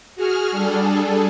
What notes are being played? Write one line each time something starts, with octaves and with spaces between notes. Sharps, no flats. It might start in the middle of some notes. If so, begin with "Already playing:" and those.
F#4 G#4 F6
G3 D4 G#4 A4